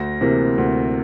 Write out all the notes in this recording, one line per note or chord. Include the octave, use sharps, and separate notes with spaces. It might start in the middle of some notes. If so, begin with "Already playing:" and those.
Already playing: D2 A#6
C3 E3 A#3
D2